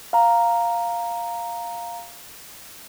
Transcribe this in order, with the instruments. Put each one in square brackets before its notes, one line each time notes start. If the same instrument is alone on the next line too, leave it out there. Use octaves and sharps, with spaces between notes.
[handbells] F5 A#5